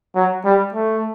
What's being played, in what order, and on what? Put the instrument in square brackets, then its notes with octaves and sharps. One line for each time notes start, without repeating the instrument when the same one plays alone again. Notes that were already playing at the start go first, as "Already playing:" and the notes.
[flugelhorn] F#3
G3
A3